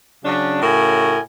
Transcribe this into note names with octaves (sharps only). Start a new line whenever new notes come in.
C#3 F#3 C#4 D4
A2 C#3 F#4 A#4 G#5